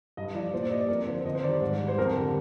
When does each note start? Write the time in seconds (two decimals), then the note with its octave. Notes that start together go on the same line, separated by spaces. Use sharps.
0.17 G2 D#5
0.35 F3 D5
0.53 A#2 C5
0.63 D5
0.71 G3 D#5
0.81 D5
0.89 F2 A#4
1.07 D3 F3 C5
1.25 F2 D#5
1.35 C5
1.43 D#3 G3 D5
1.61 G#2
1.79 G3
1.88 C5
1.98 F2 A#4
2.15 D3 G3